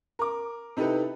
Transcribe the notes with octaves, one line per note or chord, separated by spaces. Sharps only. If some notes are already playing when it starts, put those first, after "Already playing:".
A#4 D6
C3 D#4 E4 G4 A4 B4